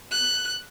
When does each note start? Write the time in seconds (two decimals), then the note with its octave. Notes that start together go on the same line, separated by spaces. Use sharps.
0.11 F#6